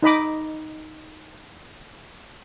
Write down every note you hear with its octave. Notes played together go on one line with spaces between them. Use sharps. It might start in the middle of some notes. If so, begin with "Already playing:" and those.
D#4 D#5 B5 D6